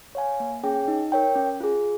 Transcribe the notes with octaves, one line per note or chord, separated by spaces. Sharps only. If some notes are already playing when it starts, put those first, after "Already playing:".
C#5 F5 G#5
A#3
C#4 G#4 C#5 G5
D#4
A#4 C#5 G5
C#4
F4 G#4